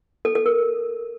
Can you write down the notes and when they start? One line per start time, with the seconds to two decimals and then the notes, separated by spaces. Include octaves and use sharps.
0.25 A4
0.35 A4
0.46 A#4